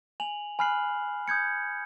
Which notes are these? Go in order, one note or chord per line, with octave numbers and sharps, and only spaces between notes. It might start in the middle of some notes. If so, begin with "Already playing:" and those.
G#5 F7 F#7
G#5 B5 F6 F#6 C7 F#7
D#6 G6 G#6 C#7